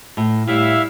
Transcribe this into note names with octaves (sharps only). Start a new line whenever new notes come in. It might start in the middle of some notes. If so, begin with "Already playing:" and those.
A2
A2 G3 E4 E5 F5